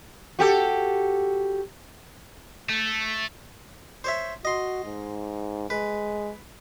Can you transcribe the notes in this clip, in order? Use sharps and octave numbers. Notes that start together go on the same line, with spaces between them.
F#4 G4 A4
A3
C5 C#5 E5
F#4 D#5 C6
G#2
G#3 B4